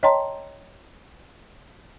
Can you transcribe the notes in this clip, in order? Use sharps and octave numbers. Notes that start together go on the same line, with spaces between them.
C#5 D#5 G5 A5 A#5 C6